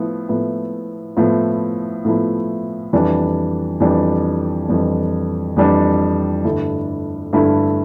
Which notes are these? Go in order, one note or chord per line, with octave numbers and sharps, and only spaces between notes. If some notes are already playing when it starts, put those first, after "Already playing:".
Already playing: A2 F3 B3 E4
A2 F3 B3 E4
A2 F3 B3 E4
A2 F3 B3 E4
F2 E3 G3 D4
F2 E3 G3 D4
F2 E3 G3 D4
F2 E3 G3 D4
G2 D3 A3 E4
G2 D3 A3 E4